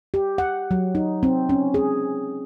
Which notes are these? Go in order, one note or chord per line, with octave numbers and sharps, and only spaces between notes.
G4
F#5
F#3
D#4
C4
C#4
G#4